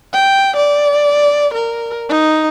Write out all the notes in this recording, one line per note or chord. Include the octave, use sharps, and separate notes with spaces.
G5
D5
A#4
D#4